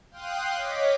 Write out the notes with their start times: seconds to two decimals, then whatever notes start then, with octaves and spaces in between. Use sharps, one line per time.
0.11 F5 G5 C6 D#6 F#6
0.55 C#5 D#5 D6 B6